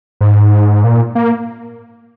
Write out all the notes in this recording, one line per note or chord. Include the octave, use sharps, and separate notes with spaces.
G#2
A#2
A#3